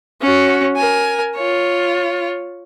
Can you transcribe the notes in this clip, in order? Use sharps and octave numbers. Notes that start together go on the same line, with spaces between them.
C#4 F#4
A#4 G#5
F4 C#5